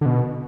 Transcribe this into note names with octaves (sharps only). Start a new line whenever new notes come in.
D3
B2